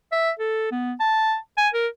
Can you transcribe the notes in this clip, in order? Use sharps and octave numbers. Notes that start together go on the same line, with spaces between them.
E5
A4
B3
A5
G#5
A#4